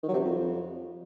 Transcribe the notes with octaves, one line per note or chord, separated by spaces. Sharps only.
D#3
F#3
C3
F#2
F2